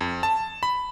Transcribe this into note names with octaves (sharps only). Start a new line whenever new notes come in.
F2
A5
B5